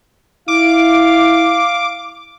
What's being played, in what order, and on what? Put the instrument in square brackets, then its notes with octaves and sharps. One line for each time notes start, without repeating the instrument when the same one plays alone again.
[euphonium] E4 [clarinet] F5 [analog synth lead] D6